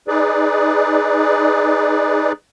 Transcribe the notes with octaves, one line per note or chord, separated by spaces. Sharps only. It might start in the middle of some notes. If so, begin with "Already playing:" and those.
D#4 G#4 B4 D5